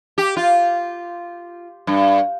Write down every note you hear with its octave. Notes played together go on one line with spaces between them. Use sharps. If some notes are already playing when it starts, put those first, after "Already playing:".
G4
F4
G2